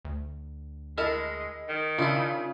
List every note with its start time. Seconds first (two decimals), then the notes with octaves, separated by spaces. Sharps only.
0.05 D2
0.98 G#3 E4 A#4 D#5 A5
1.69 D#3
1.99 C#3 D4 E4 F4